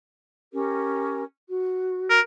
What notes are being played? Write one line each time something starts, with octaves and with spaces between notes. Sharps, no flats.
C#4 G4 A#4
F#4
A#4